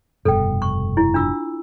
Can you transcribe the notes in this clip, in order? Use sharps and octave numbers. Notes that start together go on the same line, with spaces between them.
F1 G2 B2 A4 G5
C#6
E4
D4 F4 E6